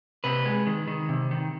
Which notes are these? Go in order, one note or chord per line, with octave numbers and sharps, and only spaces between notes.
C3 B4
G#3
D#3
D#3
C3
D#3